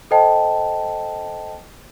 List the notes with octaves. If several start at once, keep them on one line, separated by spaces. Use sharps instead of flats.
A4 C5 D#5 G5 A5